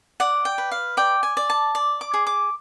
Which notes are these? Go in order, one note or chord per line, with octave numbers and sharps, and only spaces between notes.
D5 F#5
G5
B4
F5
D5 G5
G#5
D5
A5
D5
D6
G#4
D6